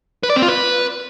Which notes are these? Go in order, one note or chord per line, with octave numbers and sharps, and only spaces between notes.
B4
D5
C4
F4
B4